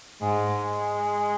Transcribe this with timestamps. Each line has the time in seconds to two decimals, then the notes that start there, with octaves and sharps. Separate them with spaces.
0.22 G#2 G#3